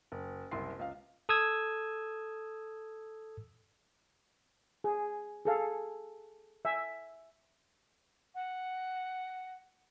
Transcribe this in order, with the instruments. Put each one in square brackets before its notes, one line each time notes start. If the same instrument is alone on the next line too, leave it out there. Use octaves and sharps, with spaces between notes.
[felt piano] F#1
F#1 C2 E4 C6 C7
C#2 F5
[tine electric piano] A4 D#6 E6 G#6
[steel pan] G#4
G#4 A4 F5
E5 G#5
[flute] F#5